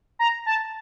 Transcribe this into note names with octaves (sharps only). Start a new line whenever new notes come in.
A#5
A5